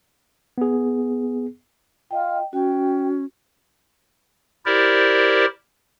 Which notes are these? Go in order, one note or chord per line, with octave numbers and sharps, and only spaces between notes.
B3 G#4
F4 D#5 G5
C#4 F#4 G5
E4 G4 A#4 C5 D5